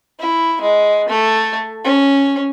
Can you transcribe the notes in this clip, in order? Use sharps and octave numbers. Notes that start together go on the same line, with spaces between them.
E4
G#3
A3
C#4